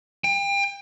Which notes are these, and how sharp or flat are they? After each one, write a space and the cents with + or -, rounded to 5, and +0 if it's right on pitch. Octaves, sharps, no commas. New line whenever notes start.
G5 +35